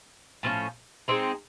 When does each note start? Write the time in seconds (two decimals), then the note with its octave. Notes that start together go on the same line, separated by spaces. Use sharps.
0.43 A2 F3 A3 C#4
1.08 G#3 C4 D#4